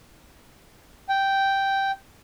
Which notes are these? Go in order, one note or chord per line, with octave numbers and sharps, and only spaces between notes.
G5